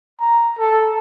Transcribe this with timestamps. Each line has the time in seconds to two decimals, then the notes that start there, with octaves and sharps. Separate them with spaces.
0.20 A#5
0.58 A4